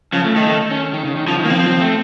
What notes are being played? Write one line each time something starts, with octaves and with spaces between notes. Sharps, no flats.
C#3 F3
A3
D#3 A3
A3
C#4
D#3
C#3
D#3
C#3 F3
D#3
A#3
F3 C4
F3
A3